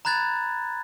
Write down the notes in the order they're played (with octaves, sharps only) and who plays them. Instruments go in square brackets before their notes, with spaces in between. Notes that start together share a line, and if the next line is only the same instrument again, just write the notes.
[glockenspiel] A#5 B5 F#6 G#6 A6